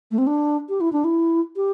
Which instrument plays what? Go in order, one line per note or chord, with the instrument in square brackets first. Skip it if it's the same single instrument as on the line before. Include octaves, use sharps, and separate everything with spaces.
[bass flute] A3
C4
D4
G4
E4
D4
E4
G4